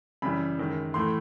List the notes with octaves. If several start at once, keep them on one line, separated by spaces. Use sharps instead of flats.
F#2 C#3 E3 G3 B5
F#2 D#3 G#3
A2 E3 A3 C6